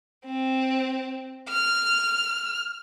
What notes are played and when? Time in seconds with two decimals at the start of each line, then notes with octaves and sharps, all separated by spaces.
0.25 C4
1.49 F6